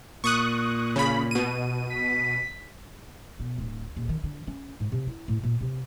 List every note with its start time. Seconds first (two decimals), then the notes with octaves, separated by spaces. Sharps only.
0.24 A#2 C#6 D#6 F#6
0.96 C#3 B5
1.31 B2 D#7
1.90 B6
3.40 B2
3.58 D1
3.97 D#1
4.09 D#3
4.24 D3
4.47 C#4
4.80 G#2
4.92 C3
5.07 E4
5.28 A2
5.43 A#2
5.61 C3